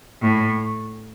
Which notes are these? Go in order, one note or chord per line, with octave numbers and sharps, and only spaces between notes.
A2